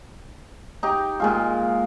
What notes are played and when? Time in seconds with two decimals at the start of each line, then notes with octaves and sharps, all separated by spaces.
0.83 D#4 G4
1.20 A#2 G#3 F4